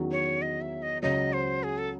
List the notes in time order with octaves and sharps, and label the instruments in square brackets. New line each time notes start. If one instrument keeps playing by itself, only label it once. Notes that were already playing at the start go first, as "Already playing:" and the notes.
Already playing: [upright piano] E2 D#3 F#3 C#4 F#4
[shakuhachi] C#5
D#5
E5
D#5
[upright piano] C#2 C#3 F#3 [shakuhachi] D#5
[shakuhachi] C5
G#4
A4